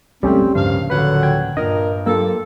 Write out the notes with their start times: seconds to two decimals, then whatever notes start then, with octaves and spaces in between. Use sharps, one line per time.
0.23 B1 F2 A2 G3 G#3 C4 C#4 G4
0.55 D1 G2 C#3 F3 A#3 C5 F5
0.90 A#2 D3 F#3 B4 F#5
1.23 G5 G#6
1.57 G2 A#2 D4 A#4 D#5
2.06 F#3 A#3 F4 G4 A4